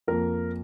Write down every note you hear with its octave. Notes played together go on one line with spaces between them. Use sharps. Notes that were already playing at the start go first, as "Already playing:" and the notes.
F2 F3 A#3 A#4